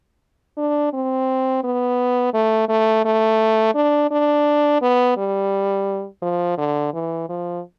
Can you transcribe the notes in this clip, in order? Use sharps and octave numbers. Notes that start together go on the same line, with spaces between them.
D4
C4
B3
A3
A3
A3
D4
D4
B3
G3
F3
D3
E3
F3